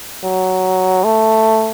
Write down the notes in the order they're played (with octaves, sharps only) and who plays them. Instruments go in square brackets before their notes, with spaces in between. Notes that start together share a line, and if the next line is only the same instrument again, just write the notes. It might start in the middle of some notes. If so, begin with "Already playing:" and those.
[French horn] F#3
A3